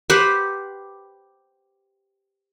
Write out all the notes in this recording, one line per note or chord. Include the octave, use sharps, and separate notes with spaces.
G4 B4 C5 F#5